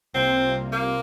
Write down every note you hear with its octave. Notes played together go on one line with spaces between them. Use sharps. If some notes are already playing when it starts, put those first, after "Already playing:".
C2 C3 G3 A#3 C4 F4
A#3